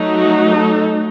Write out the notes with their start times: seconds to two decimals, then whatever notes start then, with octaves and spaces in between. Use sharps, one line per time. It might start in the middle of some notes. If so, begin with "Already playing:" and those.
Already playing: F#3 A3 D#4
0.15 F#4
0.53 A4